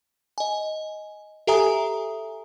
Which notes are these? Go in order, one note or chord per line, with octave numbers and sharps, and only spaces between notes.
D#5 G#5
G4 A4 E5 G#5 A#5 D#6